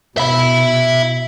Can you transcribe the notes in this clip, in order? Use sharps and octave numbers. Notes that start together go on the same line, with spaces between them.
B2 E5 B5